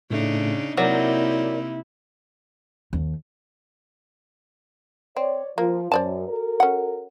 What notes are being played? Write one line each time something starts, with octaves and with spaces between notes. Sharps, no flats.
A2 C#3 A3 D4 D#4
C3 F#3 A#3 D#4 E4 A#4 D5
D#2
C4 C#5 D5
F3 A#3
F#2 C5 D5 A5
F#4 A4 A#4
C#4 F#5